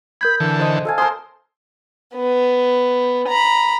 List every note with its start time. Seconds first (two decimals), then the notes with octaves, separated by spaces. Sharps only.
0.21 A#4 B5 G6 G#6
0.40 D3 E3 A4
0.59 C5 D#5
0.85 A4 F5 G#5
0.98 A#4 C5 G#5 A5 C6 D#6
2.15 B3
3.28 A#5 B5